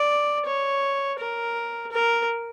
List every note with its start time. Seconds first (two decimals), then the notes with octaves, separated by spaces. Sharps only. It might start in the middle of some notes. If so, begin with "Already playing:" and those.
Already playing: D5
0.45 C#5
1.19 A#4
1.92 A#4